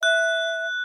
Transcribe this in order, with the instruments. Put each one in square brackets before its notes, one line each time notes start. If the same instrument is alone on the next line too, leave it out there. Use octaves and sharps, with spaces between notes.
[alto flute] E5 [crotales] F#6